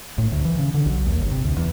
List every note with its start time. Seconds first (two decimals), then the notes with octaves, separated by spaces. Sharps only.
0.18 A2
0.32 D2
0.45 E3
0.59 C#3
0.74 D3
0.86 B1
1.06 D#2
1.19 G1
1.32 C3
1.44 D2
1.57 E2